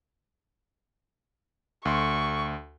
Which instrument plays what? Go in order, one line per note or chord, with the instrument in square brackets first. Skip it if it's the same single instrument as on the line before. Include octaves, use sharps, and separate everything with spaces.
[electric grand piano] D2 C6 [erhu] C#6